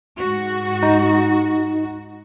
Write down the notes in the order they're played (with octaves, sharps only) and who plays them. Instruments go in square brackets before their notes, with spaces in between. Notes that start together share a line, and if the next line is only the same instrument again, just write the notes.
[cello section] G#2 F#4
[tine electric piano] D#4